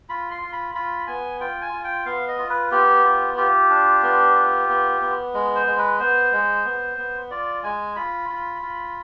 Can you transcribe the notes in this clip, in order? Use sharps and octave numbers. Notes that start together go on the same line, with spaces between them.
F4 B5
C6
F4
B5
F4 B5
B3 G#5
F4 G5
G#5
F4
G5
B3 F5
D#5
F4
B4
B3 G4
F4
F4 G4
D4
B3
F4
B3
B3
G#3
C5
G#3
B4
B3 C5
G#3
B3
B3
F4 D5
G#3 G#5
F4 B5
F4
F4